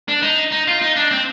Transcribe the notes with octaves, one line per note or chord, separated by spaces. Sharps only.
D4
D#4
D#4
F4
D#4
D4
C4